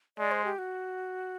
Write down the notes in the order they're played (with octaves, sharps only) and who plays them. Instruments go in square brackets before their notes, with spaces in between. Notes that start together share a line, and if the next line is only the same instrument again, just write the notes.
[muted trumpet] G#3 [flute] D5
[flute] C5
G4
F#4